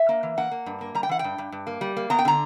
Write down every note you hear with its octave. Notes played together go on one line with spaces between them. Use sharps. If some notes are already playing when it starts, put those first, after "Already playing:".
Already playing: E5
A#3
E3
A#3 F#5
A#3
G2
A#3
G3 A#5
G5
E3 F#5
G5
G2
G2
G2
A#3
G3
A#3
B3 A#5
G5
D3 A#5